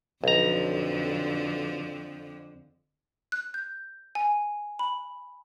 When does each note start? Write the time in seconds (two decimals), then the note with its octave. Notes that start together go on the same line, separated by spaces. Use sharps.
0.24 B1 F2 D3 F3 A#5
3.32 F#6
3.54 G6
4.15 G#5
4.79 B5